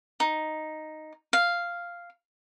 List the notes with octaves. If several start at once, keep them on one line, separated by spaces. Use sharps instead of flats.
D#4
F5